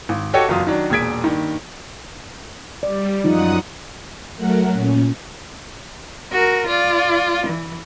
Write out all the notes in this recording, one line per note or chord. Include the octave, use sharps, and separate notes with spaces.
G#1
F#4 G4 A4 C#5 D#5 G5
F#1 E2 F#3 F4 F5 D#6
D#3 F#3 D4
E1 A#2 G#4 G#6 B6 D7
G2 D#3 A#3
G3 D5
F#2 F3 D#4 F4 F#5 D#6
F#3 A3 A#4 F#5
A#2 C#4
F#4 A#4
F4 D5
E3